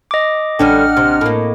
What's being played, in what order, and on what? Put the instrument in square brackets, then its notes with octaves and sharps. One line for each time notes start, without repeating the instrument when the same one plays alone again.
[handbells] D#5 D6
[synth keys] A1 D4 G5 [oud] D3 G3 C#4 [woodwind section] F#5 F6
[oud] C3
A2 A#3